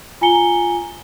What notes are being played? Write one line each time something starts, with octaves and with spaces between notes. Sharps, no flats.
F4 G#5 A#5 C#7 G7